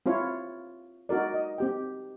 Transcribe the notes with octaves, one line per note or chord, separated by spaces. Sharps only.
C4 E4 F4 C#5
D#4 F#4 A#4 D5
D#5
C4 G4 G5